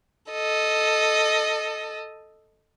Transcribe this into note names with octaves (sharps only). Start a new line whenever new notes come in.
A4 D#5